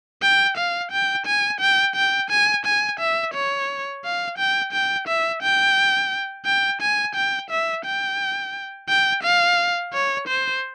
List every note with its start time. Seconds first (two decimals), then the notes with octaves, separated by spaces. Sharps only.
0.22 G5
0.57 F5
0.92 G5
1.26 G#5
1.61 G5
1.96 G5
2.30 G#5
2.65 G#5
3.00 E5
3.34 C#5
4.04 F5
4.38 G5
4.72 G5
5.08 E5
5.42 G5
6.46 G5
6.81 G#5
7.15 G5
7.50 E5
7.85 G5
8.89 G5
9.23 F5
9.93 C#5
10.28 C5